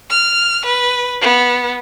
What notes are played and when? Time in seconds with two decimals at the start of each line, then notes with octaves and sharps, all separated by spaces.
0.10 F6
0.66 B4
1.21 B3